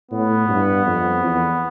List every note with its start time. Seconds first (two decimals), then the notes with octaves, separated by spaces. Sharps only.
0.11 A2 B3
0.49 G2
0.86 F2
1.24 E2